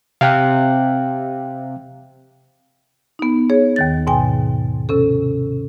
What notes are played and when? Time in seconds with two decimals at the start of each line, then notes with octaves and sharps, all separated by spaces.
0.21 C3 F5 G5 F#6
3.19 B3 D#4
3.50 G#4 C#5
3.76 D#2 D#3 A6
4.07 G#2 B2 G5 G#5
4.89 C3 C#4 A4